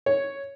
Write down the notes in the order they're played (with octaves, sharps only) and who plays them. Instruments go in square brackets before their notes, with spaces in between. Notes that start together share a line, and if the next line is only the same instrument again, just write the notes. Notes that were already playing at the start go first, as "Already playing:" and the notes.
[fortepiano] C#5